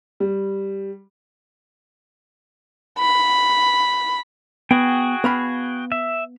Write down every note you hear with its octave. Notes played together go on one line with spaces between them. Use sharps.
G3
B5
B3 F#4 G#4 G5
B3 F5 B5
E5